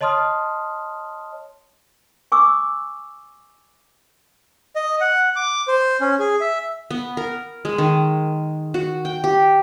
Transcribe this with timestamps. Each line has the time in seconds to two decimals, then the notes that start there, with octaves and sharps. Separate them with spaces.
0.01 C#5 D#5 A5 C6 D#6 F6
2.32 G#5 C#6 D6 E6
4.76 D#5
5.01 F#5
5.36 D6
5.68 C5
6.01 C#4
6.19 G#4
6.41 E5
6.91 B3
7.17 A#4
7.65 G#3
7.78 D#3
8.74 F#4
9.05 G5
9.24 G4